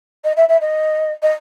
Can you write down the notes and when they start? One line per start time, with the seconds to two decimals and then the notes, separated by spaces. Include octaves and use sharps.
0.24 D#5
0.36 E5
0.49 E5
0.61 D#5
1.22 D#5